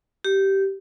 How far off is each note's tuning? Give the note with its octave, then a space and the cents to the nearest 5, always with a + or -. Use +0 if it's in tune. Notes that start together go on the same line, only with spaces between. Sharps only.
G4 -15